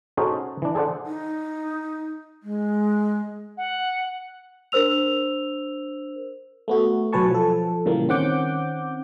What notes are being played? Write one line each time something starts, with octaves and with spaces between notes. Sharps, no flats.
C#4 D#4 F#4 G#4 A4 C5
E3 D4
G#4 A4 C5 D5 F#5
D#4
G#3
F#5
D4 A#4 C5 E6 F7
A3 B3 F#4
B1 F#3 B4 G#5 A5 C#6
F3 A4
A#2 C#3 E3 G3 A#3
D#3 C4 C#4 F#5 D6 G6